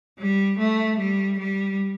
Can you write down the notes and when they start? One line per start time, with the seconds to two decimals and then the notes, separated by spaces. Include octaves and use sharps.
0.19 G3
0.59 A3
0.99 G3
1.39 G3